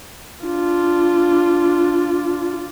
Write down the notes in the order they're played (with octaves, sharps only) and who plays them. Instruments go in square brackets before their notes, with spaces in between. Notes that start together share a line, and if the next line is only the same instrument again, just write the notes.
[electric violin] D4 F4